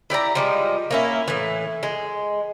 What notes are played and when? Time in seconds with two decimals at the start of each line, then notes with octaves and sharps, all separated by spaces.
0.10 E4 G4 D5 A#5
0.35 F3 G3 G#3
0.91 A#3 C#4 E4
1.28 A2 E3
1.83 G#3